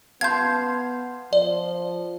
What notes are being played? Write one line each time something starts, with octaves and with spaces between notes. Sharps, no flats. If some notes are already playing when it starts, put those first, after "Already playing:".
B3 F5 A5 C6 G6 G#6
F3 D5